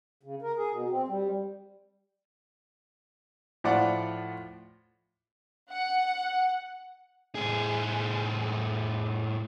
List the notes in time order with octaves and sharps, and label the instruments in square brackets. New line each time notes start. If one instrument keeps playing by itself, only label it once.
[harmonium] C#3
A#4
G#4
B2
C4
G3
[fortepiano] A2 F3 F4 D5 F#5
[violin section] F#5
[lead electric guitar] A2 G#4